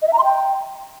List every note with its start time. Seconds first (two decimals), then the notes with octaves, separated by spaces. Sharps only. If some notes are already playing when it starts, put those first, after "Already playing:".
0.02 D#5
0.08 E5
0.13 A#5
0.19 C6
0.24 G5